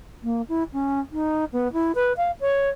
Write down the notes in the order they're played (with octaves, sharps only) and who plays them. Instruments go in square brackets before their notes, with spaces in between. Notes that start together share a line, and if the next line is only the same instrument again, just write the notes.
[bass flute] A#3
E4
C#4
D#4
B3
E4
B4
F5
C#5